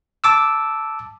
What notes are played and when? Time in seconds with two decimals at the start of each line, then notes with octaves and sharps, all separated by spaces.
0.24 A5 D6 E6